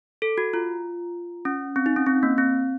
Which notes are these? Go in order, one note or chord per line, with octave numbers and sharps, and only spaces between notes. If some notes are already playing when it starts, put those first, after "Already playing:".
A4
F#4
F4
C#4
C4
D#4
C#4
C4
A#3
C4